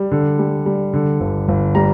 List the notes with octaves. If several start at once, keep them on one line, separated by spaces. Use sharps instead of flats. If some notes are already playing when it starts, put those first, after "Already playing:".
Already playing: G3
D3
G3
G3
D3
G1
G1
G3 A#5